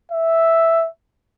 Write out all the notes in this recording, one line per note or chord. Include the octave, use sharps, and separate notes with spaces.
E5